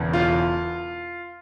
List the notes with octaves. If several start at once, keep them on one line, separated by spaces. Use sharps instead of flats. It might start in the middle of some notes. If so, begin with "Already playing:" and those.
Already playing: E1 E2 C#3 E3
F4